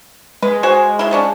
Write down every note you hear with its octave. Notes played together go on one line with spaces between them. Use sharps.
G#3 B4
F#4 C5 G#5
F#3 E4
F3 C#4 D4